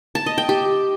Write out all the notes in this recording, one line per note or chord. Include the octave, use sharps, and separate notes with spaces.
A5
D#5
G5
G4